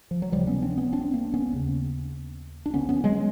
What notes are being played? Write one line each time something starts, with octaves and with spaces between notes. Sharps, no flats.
F3
F#3
D2 C3 F3 G3
B3 C#4
C4 D4
B3 C#4
C4 D4
A#3 C4
B3 C#4
D#2 C#3
D4
D2 D3 B3 C#4
B3 C#4
F#3 G#3